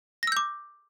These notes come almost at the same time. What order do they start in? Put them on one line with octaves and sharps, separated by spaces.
A#6 E6 G6 D6